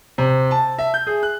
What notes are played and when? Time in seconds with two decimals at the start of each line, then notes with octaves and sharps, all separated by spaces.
0.18 C3
0.51 A5
0.78 E5
0.94 G6
1.07 G#4
1.23 F#6